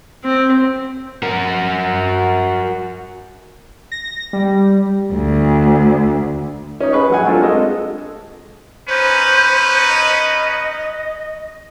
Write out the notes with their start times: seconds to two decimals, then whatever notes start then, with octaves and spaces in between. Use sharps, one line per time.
0.24 C4
1.23 F#4 A#4
3.92 A#6
4.33 G3
5.13 D2
6.80 C#4 D#4
6.93 G#4 B4 C#6
7.10 A#1 F#3 F#5 G#5
7.26 A3 C4 D4 F4 A4 A#4
7.43 G#3 A4 D#5
8.88 C#4 D#4 B4 C5
9.90 D#5